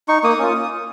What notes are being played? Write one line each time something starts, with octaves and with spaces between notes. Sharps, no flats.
D#4 C#6
A#3 D#6
C#4 F4